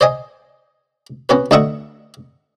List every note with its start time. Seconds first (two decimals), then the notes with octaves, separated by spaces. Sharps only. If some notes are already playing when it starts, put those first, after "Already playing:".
0.01 C5 D5 D#5 G#5
1.29 B3 C#4 F#4 B4
1.51 D2 D4 D#5 E5 F#5 C#6